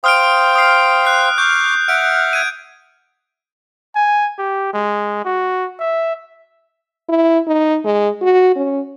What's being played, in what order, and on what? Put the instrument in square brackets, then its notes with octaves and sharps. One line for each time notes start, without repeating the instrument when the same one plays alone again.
[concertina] C5 F5 G5 [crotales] D#6 F6 D7
[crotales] D#6 C7
F#6 C7
[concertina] C#6 D6 F6 [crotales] G6
[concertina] E5 F#5 F6 [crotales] D7
[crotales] G#6 D#7
[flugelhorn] G#5
G4
G#3
F#4
E5
[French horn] E4
D#4
G#3
F#4
C#4